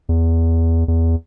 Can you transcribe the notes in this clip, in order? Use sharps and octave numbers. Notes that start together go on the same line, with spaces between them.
E2
E2